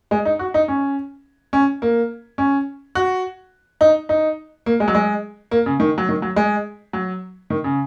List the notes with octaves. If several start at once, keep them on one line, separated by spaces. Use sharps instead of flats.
G#3
D#4
F#4
D#4
C#4
C#4
A#3
C#4
F#4
D#4
D#4
A#3
G#3
F#3
G#3
A#3
C#3
D#3
F#3
D#3
F#3
G#3
F#3
D#3
C#3